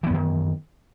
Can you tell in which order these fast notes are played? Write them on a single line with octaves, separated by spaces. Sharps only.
E3 B3 F#2 D#3